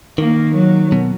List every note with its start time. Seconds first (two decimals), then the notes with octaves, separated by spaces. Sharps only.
0.18 D#3 A#3
0.54 F#3
0.92 B2